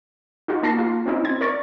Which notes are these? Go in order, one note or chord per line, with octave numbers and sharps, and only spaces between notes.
D#4 F4 F#4
A#3 A5 A#6 C7
A#3 F4
C4 C#4 D#4 E4
C4 G#6
A#4 D5 C#6 A6